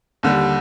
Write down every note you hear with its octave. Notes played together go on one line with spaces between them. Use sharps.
D#2 D3 G3